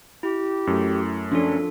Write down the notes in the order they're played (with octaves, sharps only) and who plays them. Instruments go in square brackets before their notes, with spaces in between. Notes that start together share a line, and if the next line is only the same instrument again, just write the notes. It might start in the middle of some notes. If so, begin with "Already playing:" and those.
[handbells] E4 [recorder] G4
[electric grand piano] F#2 A3
[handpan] F3 D4 [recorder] C#4 [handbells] F4 A4